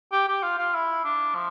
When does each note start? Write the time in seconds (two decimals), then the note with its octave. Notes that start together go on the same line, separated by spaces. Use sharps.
0.12 G4
0.28 G4
0.43 F4
0.58 F4
0.74 E4
1.04 D4
1.35 F3